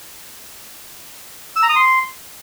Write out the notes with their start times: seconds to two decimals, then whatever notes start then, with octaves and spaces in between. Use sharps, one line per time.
1.56 E6
1.63 A#5
1.69 D#6
1.76 C6